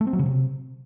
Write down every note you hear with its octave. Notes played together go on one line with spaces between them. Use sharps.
A3
C4
F#3
C#3
C3